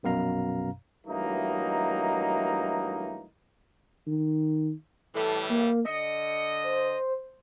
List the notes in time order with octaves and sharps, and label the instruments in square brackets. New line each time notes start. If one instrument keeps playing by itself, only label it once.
[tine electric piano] A#1 F#2 B2 F5 A#5
[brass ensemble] G2 E3 F#3 A3 A#3 D#4
[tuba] D#3
[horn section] A2 E3 G3 [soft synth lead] A4
[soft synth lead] A#3
[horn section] D3 D#5 [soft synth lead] C#7
[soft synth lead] C5